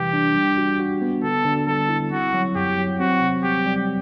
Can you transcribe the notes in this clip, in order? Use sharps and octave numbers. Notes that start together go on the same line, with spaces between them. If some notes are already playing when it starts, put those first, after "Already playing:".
Already playing: C3 E3 G3 G4
D4
G3
F#4
F#4
B3
D3 A4
D3
G3 A4
E4
C4 F#4
F#3
F#2 G4
F#3
C4 F#4
C3
G3 G4
G3